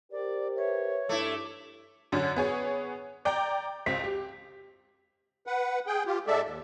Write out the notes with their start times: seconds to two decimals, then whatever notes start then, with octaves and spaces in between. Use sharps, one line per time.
0.12 G4 A#4 C5 D5
0.57 B4 C#5 E5
1.09 G2 A3 E4 D6
2.12 F#2 D3 C#4
2.36 B3 G#4 C#5
3.25 D5 G5 A#5
3.86 C#2 C4 B6
4.04 G4
5.47 B4 F#5
5.87 G#4 G5
6.06 F4 G4
6.27 G#2 G#3 A4 D5 E5
6.45 D#2